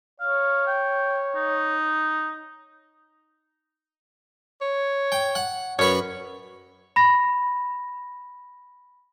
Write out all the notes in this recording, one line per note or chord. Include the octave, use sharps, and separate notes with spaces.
C#5 F5
G5
D#4
C#5
G5
F#5
F#2 B4 C#5 C#6
B5 A#6